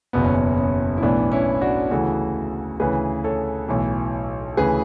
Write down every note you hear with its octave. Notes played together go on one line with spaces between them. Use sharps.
F#1 E2 B2 B3
C#4
B3
C#4
E4
B1 A2 E3 B3 D4
C#4 E4
D4 F#4
D2 C#3 E3 F#4 A4
D2 C#3 E3 G#4 B4
A4 C#5
B1 A2 E3
D2 C#3 E3 G#4 B4